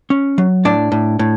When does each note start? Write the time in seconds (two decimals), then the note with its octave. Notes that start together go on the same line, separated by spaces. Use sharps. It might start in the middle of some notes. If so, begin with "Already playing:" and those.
0.10 C#4
0.38 F#3
0.65 A2 D4 D5
0.92 A2
1.19 A2